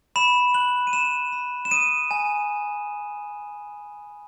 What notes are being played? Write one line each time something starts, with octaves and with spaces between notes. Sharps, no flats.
B5 E7
F#6 F#7
D#7
B5 E7
B5
E7
D#6 D#7
G#5